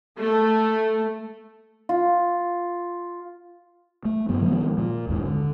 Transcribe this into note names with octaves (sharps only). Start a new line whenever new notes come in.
A3
F4
A3
G2 F#3 B3
D#3 F3 G#3 B3
A#2
D#1 D#2 G#2
D3